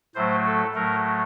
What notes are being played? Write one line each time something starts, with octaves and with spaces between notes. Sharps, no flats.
A2 F#3 A3 C5
A4
A2 F#3 A3 A#4